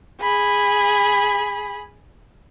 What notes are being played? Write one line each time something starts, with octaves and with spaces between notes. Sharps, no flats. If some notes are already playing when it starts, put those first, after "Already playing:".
G#4 B5